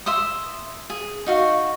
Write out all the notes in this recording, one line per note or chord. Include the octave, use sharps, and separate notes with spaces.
E5 C6 D#6
G#4
D#4 F#4 F5